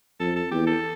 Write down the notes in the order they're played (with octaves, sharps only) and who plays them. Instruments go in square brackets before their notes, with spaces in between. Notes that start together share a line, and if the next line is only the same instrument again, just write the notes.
[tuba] F2 [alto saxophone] A4
[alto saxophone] A4
[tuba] E2 [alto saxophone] G4
[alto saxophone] A4